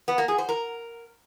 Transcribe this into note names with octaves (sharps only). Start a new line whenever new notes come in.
B3
A#3
G#4
C5
A#4